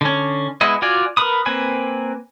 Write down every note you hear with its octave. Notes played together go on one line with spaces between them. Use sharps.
D3 C#4
G#3 B3 E4 D#5
F4 F#4 D5 G#5
A#4 B4 B5 D#6
A#3 C4 B4 G#5